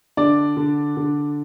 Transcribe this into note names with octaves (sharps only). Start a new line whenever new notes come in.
D3 D4 D5
D3
D3